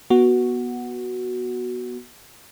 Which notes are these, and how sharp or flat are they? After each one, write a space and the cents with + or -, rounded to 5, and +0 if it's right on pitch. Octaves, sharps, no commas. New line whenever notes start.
B3 -20 F#4 +0